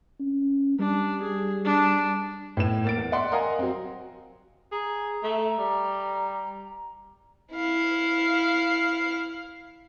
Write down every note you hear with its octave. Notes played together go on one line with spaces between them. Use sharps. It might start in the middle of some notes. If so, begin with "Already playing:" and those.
C#4
G3 D4
G#4
D4
A2 B3 E7
A#3 A6 D7
E2
D5 E5 F#5 C6
A#4 D#5 F5 F#5 G#5 A#5
F#3 C4
G#4 A#5
A3
G3
E4 F5